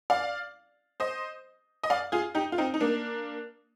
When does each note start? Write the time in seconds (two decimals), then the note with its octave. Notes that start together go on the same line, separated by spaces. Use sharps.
0.10 D5 F5
1.00 C5 D#5
1.83 D#5
1.90 D5 F5
2.12 F4 G#4
2.35 D#4 G4
2.52 F4
2.58 C4 D#4
2.74 D#4
2.80 A#3 D4